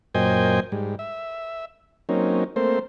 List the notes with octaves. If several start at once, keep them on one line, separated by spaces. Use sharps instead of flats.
F#2 A#2 C5 D#5 G5 G#5
G#2 G3
E5
F#3 A#3 C4 C#4 D#4
A3 A#3 C4 C5